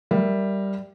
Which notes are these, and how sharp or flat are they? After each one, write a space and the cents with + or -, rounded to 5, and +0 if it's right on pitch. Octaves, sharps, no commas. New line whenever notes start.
G3 +0 A#4 +0 E5 +0